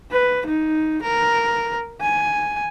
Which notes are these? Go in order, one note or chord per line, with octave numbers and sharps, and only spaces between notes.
B4
D#4
A#4
G#5